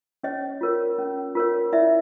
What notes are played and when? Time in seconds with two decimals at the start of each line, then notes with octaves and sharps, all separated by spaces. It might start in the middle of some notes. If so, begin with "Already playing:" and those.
0.23 C#4 C#5 D#5
0.61 F4 A#4 C#5
0.98 C#4
1.35 F4 A#4 C#5
1.72 E4 D5 E5